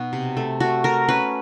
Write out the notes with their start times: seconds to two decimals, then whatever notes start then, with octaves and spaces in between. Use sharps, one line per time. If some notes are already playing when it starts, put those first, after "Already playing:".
Already playing: B2 D#4 F#4
0.13 C3
0.37 A3
0.60 A3 F#4
0.84 A3 A#4
1.09 C#4 B4